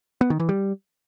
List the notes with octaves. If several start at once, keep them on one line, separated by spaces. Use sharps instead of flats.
B3
D#3
E3
G3